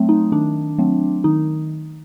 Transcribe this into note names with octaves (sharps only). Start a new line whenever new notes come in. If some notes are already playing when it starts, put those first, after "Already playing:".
Already playing: F#3 A3 C4
D#4
D#3 D4
F#3 A3 C4
D#3 D#4